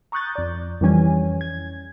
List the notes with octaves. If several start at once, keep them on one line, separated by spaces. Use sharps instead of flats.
A#5 C#6 D#6 F#6 G6 A6
F2 D5
F2 E3 G3 C#4 G#5
G#6